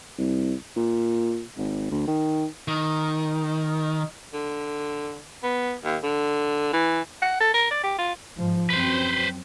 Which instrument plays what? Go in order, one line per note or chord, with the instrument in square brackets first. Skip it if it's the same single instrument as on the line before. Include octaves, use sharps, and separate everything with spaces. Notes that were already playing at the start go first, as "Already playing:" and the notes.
[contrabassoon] C2
A#2
G#1
D2
D#3
[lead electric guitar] D#3
[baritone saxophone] D3
B3
D#2
D3
E3
[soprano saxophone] F#5
A4
A#4
D5
G4
F4
[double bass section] G#2 F3
[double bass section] F#2 F#3 C4 [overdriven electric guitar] B4 C5